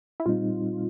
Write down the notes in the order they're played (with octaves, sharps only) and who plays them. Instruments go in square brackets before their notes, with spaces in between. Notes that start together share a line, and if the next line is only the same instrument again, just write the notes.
[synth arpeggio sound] E4
[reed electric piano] A#2 G3 C4 D#4 [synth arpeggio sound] F4